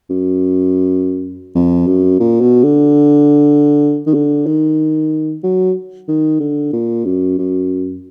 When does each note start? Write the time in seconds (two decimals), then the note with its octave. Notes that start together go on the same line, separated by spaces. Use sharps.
0.10 F#2
1.55 F2
1.87 F#2
2.20 A#2
2.41 B2
2.63 D3
4.07 D#3
4.14 D3
4.46 D#3
5.44 F#3
6.08 D#3
6.40 D3
6.73 A#2
7.05 F#2
7.38 F#2